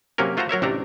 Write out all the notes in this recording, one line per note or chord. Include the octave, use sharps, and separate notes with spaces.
C3 F#3 A#3 C#4 A#4
A3 F4 F#4 C5 A5 A#5
F#3 A#4 C#5 E5
A1 C3 A3 D4 A#5